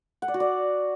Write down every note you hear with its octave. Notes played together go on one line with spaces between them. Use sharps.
F#5
D5
F#4
D5